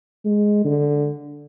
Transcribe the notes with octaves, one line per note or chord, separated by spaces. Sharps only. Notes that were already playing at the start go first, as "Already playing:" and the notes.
G#3
D3